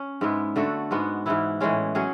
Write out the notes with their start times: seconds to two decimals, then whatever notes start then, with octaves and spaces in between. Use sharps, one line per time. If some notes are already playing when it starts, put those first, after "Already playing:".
Already playing: C#4
0.21 G#2 G#3 B3 E4
0.56 D3 A3 D4 F#4
0.91 G#2 G#3 B3 F#4
1.26 G#2 E3 B3 E4
1.60 A2 E3 G#3 C#4
1.95 F#3 C#4 G#4